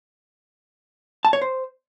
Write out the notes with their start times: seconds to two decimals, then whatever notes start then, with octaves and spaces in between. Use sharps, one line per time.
1.25 A5
1.33 C#5
1.42 C5